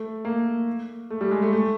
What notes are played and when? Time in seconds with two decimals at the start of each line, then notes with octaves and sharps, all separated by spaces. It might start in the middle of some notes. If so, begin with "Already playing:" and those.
Already playing: A3
0.25 A#3
1.10 A3
1.21 G3
1.31 G#3
1.42 A3
1.53 A3